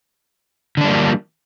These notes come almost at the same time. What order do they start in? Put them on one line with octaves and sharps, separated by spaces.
D3 D4 G3 A#3 F3